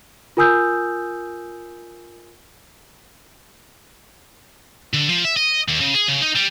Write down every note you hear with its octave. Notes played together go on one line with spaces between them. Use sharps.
F4 A#4 G#5 D#6 E6 G6
D3
F3
E5
D#5
D#2
C#3
G#4
C#3
D#4
G3